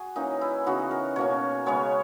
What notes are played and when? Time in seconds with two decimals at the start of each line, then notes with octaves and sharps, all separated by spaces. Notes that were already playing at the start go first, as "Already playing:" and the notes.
Already playing: F#4 G#4
0.16 E3 A#3 C#4 D#4
0.41 E4
0.66 C#3 E3 B3 D#4 F#4
0.91 A#4
1.16 B2 A#3 C#4 C#5
1.66 C#3 G#3 B3 C#5